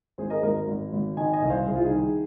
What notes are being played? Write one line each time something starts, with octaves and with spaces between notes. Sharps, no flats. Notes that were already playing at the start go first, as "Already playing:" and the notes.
G#1 G#4 C5
A#4 D#5
G#1 A#4 D#5
G#1
G#1
D#3 D#5 G#5
D#5 G#5
C2
C5 F5
C2 G#4
F4
D#4 G#4
D#3